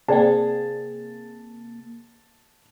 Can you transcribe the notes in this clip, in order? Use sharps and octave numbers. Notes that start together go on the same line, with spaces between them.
C3 A#3 G#4 C5 D5 G5 A5